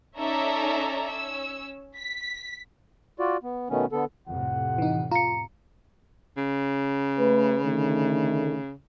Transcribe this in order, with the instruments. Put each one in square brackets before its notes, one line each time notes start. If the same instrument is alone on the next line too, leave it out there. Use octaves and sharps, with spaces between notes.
[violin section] C#4 D#4 A4 D5 E5 A#5
C#4 E6
B6
[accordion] F4 F#4 D5
B3
B2 D#3 A3 B3 C#4
D3 B3 A4
[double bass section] F2 A2 C3 [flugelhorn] F#5
[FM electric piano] E3 D#4
[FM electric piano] F4 [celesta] A#5 C#7
[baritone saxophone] C#3
[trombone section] A3 B4
D3 D#3 A3